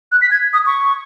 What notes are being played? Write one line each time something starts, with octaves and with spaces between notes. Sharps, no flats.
F#6
B6
G#6
D#6
C#6